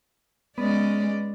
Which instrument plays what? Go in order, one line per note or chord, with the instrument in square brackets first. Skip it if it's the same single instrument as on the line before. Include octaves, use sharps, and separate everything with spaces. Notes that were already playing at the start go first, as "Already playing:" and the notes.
[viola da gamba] G#3 C#4 D5 [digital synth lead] B3